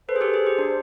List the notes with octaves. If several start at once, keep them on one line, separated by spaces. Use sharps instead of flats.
A4 B4 C5
G#4
G4 A4
G#4
G4
D4